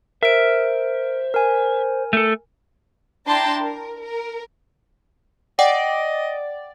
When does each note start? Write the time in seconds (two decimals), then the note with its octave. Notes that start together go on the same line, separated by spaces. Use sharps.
0.23 A#4 C5 E5 F6 D7
1.34 A#4 G#5
2.13 A3 A4
3.27 D4 E4 G5 A5 A#5 C6
3.61 A#4
4.03 A#4
5.59 D5 D#5 F#5 G5